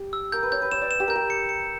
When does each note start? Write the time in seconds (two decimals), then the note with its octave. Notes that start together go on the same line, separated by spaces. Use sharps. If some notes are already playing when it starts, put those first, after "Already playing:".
Already playing: G4
0.13 E6
0.32 A#4 G6
0.43 B4
0.52 C#5 G6
0.62 B4
0.71 C#5 E7
0.81 D5
0.91 E7
1.00 G4
1.08 A#4 G6
1.16 G4
1.30 C#7
1.49 C#7